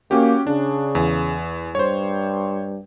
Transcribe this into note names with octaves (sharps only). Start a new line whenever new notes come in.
A#3 C#4 F#4 G4
C#3 D4
E2
G2 C5 C#5